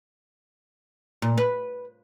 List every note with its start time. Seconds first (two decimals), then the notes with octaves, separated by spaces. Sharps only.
1.22 A#2
1.38 B4